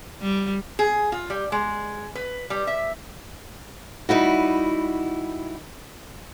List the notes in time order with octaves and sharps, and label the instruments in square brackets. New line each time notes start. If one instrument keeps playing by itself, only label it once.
[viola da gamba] G3
[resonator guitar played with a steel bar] G#4
F4
G3
G#3
B4
G3
E5
[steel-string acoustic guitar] G3 D#4 E4 F#4